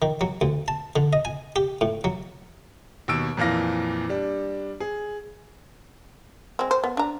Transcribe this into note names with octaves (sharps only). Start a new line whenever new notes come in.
D#3
F#3
D2
A5
D3
D#5
G#5
G4
A2
F#3
D#2 B2 E6 D7
F2 A#2 E3 F5 A#6
G3 D4
G#4
G#3 C4
C5
B3
D4 A#5